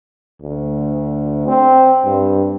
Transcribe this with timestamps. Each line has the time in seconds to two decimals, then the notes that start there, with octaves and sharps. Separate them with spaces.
0.42 D2
1.48 C4
2.04 G2